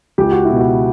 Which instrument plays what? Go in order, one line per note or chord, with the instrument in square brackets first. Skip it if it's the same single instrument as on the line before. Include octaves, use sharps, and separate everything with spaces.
[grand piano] C#2 G4
F#4
B2 E4
F#4